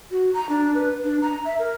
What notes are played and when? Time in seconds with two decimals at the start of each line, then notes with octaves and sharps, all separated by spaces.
0.11 F#4
0.34 A#5
0.49 D4
0.75 B4
1.04 D4
1.22 A#5
1.45 E5
1.59 A#4